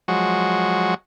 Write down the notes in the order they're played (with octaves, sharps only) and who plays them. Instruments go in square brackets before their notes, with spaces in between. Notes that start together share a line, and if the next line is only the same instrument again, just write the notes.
[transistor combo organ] F3 F#3 G#3 F#4